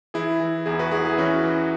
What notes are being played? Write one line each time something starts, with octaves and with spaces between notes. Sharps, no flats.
E3 E4 G#4
E3
E2 E4 G#4
F#4 B4
E2 E4 G#4
E4 G#4
E3 C#4 F#4
E3